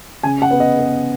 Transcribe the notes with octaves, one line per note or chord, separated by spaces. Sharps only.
C#3 G#5
F#5
B3
D#5
B3